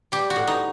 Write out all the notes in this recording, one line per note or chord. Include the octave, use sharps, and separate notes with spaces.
G3 G4
F#4
A2
D#4